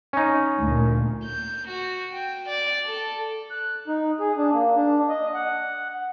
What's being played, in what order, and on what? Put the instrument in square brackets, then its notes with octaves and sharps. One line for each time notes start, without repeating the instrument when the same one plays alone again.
[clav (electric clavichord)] C#4 D#4
[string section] D2 A#2
[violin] G6
F#4
G5
D5
A4
[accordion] F#6
D#4
G#4
D4
A#3
D4
D#5
F#5